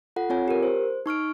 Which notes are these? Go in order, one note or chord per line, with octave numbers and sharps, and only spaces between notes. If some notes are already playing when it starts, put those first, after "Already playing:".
F4 A4 F#5
C4 F4 C#5 G#5
G4 A#4
C5
D#4 C#6 F6 D7